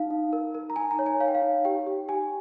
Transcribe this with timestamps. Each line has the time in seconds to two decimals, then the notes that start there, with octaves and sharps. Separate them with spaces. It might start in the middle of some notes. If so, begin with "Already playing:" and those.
Already playing: D#4 F5
0.11 D#4
0.33 A#4
0.55 A#4
0.70 A#5
0.76 D#4 G#5
0.91 A#5
0.99 C#5
1.06 G#5
1.20 C#5 F5
1.28 G5
1.35 F5
1.42 D#4
1.65 G4 G5
1.87 G4
2.09 G4 G#5